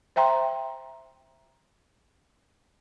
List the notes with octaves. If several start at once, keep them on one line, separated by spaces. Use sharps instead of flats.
C5 E5 G5 A#5 C6